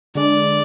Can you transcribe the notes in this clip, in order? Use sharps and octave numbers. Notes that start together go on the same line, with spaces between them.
D3 G#3 D4 D5